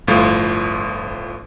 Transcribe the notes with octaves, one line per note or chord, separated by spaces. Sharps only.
G1 A2 F3 F4